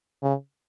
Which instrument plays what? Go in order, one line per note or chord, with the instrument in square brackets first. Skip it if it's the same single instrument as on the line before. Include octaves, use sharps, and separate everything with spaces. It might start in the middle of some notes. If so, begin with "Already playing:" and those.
[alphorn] C#3